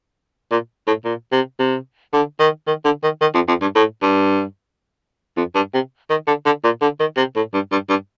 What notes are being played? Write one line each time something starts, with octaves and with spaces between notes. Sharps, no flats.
A#2
A2
A#2
C3
C3
D3
D#3
D#3
D3
D#3
D#3
F2
F2
G2
A2
G2
F2
G2
C3
D#3
D3
D3
A#2
D3
D#3
C3
A2
G2
G2
G2